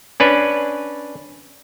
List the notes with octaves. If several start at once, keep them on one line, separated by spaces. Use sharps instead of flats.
C#4 D4 B4